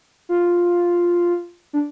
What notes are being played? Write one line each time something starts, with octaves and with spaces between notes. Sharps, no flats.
F4
D4